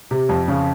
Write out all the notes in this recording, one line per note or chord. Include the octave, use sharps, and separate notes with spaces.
C3
F2
C#3